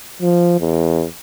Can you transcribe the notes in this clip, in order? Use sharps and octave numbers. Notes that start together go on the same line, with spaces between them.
F3
E2